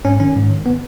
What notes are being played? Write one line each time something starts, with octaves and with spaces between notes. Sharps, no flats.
G#2 C#4
D#3 C#4
G#2
D#3
B3